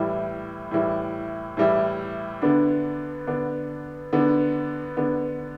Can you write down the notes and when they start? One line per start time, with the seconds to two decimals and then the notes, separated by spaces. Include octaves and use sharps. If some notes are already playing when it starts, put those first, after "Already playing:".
Already playing: A2 E3 G3 E4
0.71 A2 E3 G3 E4
1.57 A2 E3 G3 E4
2.42 D3 B3 D4
3.27 D3 B3 D4
4.13 D3 B3 D4
4.97 D3 B3 D4